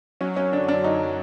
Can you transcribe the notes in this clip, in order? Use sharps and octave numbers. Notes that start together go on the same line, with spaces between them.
F#3 C#4
F#2 C#4
D3 D4
F#2 D4
F#2 D#4